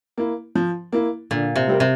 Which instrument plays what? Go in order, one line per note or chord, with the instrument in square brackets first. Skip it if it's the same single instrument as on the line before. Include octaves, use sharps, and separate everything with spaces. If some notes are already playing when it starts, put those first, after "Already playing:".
[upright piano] A#3 E4
F3
A#3 E4
[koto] A#2 [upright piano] D3
[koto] C3
[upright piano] G3 C4 G4 A#4
[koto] C3